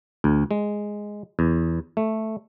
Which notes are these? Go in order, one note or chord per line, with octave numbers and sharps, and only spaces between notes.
D2
G#3
E2
A3